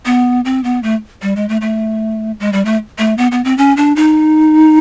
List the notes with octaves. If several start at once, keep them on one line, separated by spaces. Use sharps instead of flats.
B3
C4
B3
A3
G3
G#3
A3
A3
G#3
G3
A3
A3
B3
B3
C4
C#4
D4
D#4